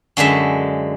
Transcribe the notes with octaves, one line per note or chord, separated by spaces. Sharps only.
F#2 D3 G#3 E5